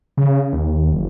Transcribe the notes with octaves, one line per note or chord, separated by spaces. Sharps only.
C#3
D#2
F#1